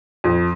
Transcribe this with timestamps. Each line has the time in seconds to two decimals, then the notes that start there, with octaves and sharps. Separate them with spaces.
0.24 F2